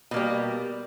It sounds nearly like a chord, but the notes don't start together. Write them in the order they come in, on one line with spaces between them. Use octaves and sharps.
B2 A#3 G3